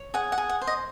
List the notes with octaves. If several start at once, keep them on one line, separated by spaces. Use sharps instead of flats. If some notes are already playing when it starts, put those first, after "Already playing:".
Already playing: C#5
G#4 F#5
F#5
G#4
F#5
C5
D#5